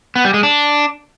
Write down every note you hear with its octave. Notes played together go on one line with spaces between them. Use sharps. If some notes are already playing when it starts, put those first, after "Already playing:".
B3
G3
G#3
D4